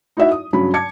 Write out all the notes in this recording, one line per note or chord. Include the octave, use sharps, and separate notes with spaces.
D#4 E4 F#4 E5 F#5
D#6
G2 C#3 F#3 B5
A5 D6 G#6 C#7